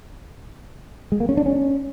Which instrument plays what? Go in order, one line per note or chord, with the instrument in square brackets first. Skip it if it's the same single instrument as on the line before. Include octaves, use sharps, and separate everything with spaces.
[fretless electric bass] G#3
A#3
C#4
D4
C#4